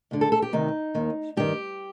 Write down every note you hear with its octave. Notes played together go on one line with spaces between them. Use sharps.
D2 D3
A4
A4
G4
D2 C3 D#3 D#4
D#2 D#3
G2 D#3 G4